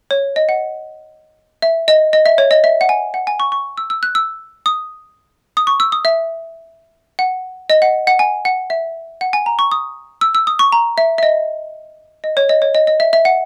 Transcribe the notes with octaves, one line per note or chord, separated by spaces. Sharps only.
C#5
D#5
F#5
E5
D#5
D#5
E5
C#5
D#5
E5
F#5
G#5
F#5
G#5
C#6
C#6
E6
E6
F#6
E6
D#6
D#6
C#6
E6
D#6
E5
F#5
D#5
F#5
F#5
G#5
F#5
E5
F#5
G#5
A#5
C#6
D#6
E6
E6
D#6
C#6
A#5
E5
E5
D#5
D#5
C#5
D#5
C#5
D#5
D#5
E5
E5
F#5